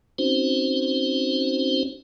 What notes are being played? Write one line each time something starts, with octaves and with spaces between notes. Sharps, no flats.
C4 C#4 D#4 F#4 C5